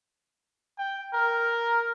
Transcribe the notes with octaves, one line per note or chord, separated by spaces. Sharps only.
G5
A#4